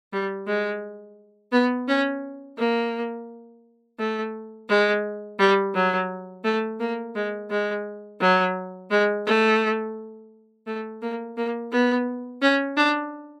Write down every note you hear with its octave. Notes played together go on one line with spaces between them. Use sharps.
G3
G#3
B3
C#4
A#3
A3
G#3
G3
F#3
A3
A#3
G#3
G#3
F#3
G#3
A3
A3
A#3
A#3
B3
C#4
D4